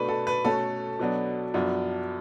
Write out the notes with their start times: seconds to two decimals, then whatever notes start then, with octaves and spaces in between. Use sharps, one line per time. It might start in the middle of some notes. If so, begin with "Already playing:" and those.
Already playing: B2 A3 D4 B4
0.09 A4
0.27 B4
0.45 B2 A3 C#4 A4
0.99 B2 F#3 B3 D4
1.54 F#2 F3 B3 D4